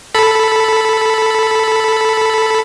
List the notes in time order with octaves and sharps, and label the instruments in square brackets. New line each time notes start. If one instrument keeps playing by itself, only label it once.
[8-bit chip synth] A4 B5